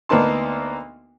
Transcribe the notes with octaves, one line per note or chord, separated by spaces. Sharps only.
D2 A#3 B3 D#4 A5 C6